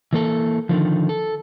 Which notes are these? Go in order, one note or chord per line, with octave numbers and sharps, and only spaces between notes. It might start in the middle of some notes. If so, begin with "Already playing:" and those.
E3 A#3 A4
D3 D#3 F3
A4